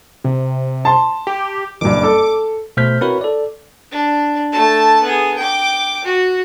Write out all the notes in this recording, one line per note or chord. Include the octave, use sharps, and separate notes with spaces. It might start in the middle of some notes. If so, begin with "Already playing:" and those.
C3
A5 C6
G4
F#1 G2 D6
A4
B2 A3 C5 F6 G6 B6
C4 E4 F#4 A#4 B4 C#5
A4 D5
D4
A3 A5
B3 G#4
G5 D6
F#4